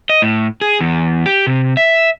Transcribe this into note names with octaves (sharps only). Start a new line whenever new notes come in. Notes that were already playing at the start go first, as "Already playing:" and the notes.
D#5
A2
G#4
E2
G4
C3
E5